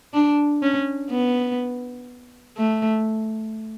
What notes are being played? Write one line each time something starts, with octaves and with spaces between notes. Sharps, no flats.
D4
C#4
B3
A3